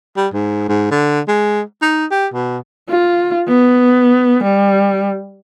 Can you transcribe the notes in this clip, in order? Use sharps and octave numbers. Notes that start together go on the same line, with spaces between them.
G3
G#2
G#2
D3
G#3
D#4
G4
B2
F4
B3
G3